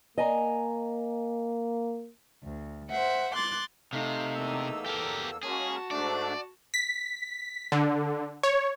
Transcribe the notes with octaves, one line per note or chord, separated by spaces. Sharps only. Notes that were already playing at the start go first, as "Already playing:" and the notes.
A#3 D#5 G#5 A#5
D2
C5 E5 F#5
C6 D6 F#6 A6
C3 A3 D#4 F5
E2 A#3 E6
G4 A4 A#4
G#3 A#3 C#4 F#4 G#4 A5
G#2 A3 D4 D5
B6
D3
C#5